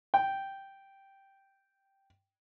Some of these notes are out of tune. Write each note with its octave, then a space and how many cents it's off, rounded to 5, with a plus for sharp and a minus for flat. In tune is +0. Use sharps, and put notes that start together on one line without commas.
G5 -5